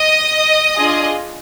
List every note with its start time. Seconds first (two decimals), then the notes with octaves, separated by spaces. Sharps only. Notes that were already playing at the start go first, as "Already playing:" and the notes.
Already playing: D#5 D#6
0.75 D4 F4 G#4